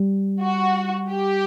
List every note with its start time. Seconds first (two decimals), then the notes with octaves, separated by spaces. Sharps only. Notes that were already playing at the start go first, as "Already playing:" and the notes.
Already playing: G3
0.41 F#4
1.11 G4